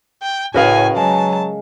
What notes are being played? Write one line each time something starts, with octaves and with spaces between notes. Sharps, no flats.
G5
A2 C#3 F#4 A#4 B4 D#5 F5 G#5
F#3 G#3 A5